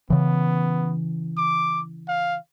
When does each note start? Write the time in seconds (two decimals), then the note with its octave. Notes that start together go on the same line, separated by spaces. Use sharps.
0.10 C#3 E3 B3
1.37 D6
2.08 F5